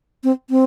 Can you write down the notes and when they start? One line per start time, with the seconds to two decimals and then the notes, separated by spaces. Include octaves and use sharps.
0.24 C4
0.50 C4